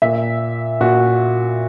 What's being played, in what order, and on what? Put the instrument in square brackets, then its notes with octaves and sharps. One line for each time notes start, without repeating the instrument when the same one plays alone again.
[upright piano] A#2 E5
A#2 F#4